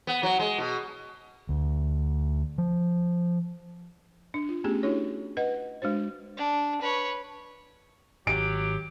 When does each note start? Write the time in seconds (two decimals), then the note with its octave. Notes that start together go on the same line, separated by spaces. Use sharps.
0.07 B3
0.23 F#3
0.39 G#3
0.58 B2
1.49 D2
2.58 F3
4.34 D4
4.49 F4
4.64 A3 B3 C#4 G4 G#4
4.83 D4 E4 F#4 G#4 C#5
5.37 B4 D#5 F#5
5.82 G#3 D4 F#4 C5
6.37 D4
6.82 B4 C#5
8.27 G#1 F#3 G4 D7